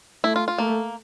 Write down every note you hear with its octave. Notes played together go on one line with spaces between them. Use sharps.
A3 E4
F4
F4
A3 A#3